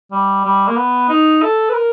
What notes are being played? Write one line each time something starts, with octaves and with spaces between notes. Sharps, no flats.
G3
G3
A#3
B3
D#4
A4
B4
A#4